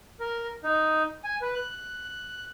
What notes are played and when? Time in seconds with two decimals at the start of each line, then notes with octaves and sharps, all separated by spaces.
0.20 A#4
0.64 D#4
1.24 G#5
1.42 B4
1.55 F#6